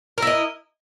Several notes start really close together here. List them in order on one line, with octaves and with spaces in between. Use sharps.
A#4 E4 D#5